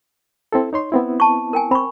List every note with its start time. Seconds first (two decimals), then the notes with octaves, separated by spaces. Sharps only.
0.52 C4 E4 A4
0.73 D#4 C#5 C6
0.92 B3 C4 E4
1.20 A5 C#6
1.53 A#4 G5 G#5
1.71 C4 B5 C#6